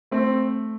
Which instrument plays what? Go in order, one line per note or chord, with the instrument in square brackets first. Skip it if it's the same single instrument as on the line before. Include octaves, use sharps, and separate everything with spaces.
[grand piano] A3 [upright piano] C4